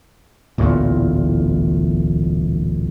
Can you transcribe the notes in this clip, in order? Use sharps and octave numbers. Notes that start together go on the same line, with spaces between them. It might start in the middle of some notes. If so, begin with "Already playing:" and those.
D1 A1 E2 A#2